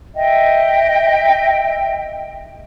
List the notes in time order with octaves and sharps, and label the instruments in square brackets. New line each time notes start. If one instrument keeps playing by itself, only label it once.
[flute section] D#5 E5 G5